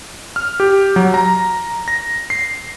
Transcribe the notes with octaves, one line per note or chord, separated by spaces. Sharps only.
F6
G4
F#3
A#5
A#6
C7